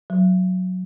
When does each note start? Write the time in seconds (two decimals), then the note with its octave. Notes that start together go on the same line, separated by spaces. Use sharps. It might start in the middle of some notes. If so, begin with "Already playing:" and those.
0.10 F#3